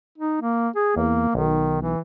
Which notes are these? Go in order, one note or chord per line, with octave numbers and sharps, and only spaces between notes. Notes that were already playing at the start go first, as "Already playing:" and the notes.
D#4
A#3
G#4
E2 A#3
B1 D#3
E3